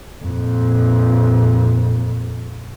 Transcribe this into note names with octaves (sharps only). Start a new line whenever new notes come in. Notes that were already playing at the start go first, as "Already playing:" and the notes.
F2 A#2